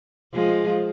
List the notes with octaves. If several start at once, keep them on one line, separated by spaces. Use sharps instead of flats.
F3 G#3